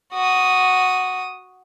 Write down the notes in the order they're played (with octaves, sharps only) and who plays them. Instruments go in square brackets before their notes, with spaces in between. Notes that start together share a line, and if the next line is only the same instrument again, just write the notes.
[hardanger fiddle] F#4 D#6